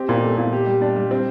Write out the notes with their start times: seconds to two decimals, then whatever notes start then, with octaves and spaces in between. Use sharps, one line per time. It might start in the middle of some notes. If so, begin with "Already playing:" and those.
Already playing: C4 G4
0.09 A#2
0.24 A3
0.38 A#2
0.53 G4
0.66 G3
0.82 D4
0.96 G3
1.11 C4